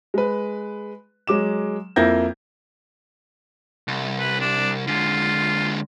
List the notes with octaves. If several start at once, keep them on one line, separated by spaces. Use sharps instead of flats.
G#3 B4
F#3 G#3 D6 E7
F2 A#3 E4 G6 G#6 A#6
C2
B4
D4
D3 G#3 F4